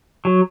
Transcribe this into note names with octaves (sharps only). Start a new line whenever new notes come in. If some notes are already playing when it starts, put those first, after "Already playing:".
F#3